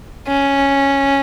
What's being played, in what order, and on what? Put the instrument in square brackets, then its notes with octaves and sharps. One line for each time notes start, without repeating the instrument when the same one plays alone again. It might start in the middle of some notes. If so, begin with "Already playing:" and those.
[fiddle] C#4